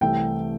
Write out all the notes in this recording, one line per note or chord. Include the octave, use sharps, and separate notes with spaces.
C2 C3 E3 A3 G5